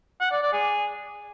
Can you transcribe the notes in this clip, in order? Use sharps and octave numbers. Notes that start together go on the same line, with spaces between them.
F#5
D5
D5
G#4